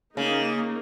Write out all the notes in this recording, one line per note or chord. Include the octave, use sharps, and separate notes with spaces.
C#3 A#3 D#4